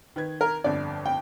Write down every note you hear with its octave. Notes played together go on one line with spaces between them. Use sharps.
D#3 B4 G#6
A#4
G1 F2 D3 D5
G5